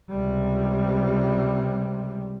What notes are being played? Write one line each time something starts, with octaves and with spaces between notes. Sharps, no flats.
C#2 C3 G3